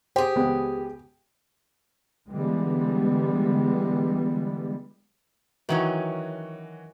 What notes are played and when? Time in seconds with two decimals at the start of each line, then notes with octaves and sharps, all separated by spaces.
0.16 G4 G#4 C5 G5
0.35 C#2 G#3 B3
2.28 D3 E3 G3 G#3 B3
5.69 D#3 E3 F#3 C#4 F#4